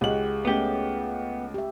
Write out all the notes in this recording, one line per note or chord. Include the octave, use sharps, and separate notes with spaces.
C#2 G#3 G4 F#5 F#7
A3 B3 C#4 G4
G4 E5